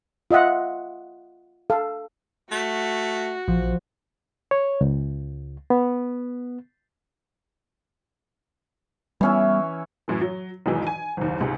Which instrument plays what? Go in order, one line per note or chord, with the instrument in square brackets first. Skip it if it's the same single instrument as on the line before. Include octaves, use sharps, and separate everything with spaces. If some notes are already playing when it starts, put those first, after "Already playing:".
[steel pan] F4 D#5 E5 F#5
A4 F5
[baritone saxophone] A3 [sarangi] F#4
[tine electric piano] A#1 [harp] F3
[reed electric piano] C#5
C#2
B3
[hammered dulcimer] E3 C#4 E4 [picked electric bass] G3 B3
[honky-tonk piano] F#2 A2 E3
F#3
B1 E2 G#2 B2 D#3 E3
G#5
F#1 D#2
C#2 G#2 C3